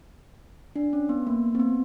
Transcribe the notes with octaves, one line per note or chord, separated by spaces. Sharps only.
D4
C#4
B3
A#3
C4
B3